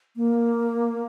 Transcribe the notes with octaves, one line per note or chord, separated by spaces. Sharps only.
A#3